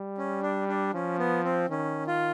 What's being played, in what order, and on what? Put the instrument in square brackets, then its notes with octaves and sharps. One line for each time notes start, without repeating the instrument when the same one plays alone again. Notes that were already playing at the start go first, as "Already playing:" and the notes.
Already playing: [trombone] G3
[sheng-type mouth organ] C#4
D4
D4
[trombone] F3 [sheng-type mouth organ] C#4
[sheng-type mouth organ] B3
C4
[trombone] D#3 [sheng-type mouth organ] C#4
[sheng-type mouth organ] F4